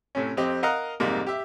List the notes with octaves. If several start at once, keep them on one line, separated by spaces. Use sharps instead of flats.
A2 C3 C#4
F2 C4 G4 D#5
A#4 D#5 F5 F#5 A#5
F2 G#2 C3 G3 A#3
G4 E5